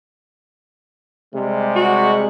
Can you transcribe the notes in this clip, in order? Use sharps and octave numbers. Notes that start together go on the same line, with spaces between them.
C3 G3 G#3
F#4